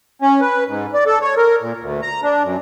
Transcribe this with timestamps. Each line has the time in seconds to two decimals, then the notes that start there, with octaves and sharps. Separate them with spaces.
0.22 C#4
0.41 B4
0.67 G#2
0.94 D5
1.06 A4
1.22 C#5
1.37 A#4
1.61 A#2
1.80 D2
2.02 A#5
2.23 D4
2.43 F#2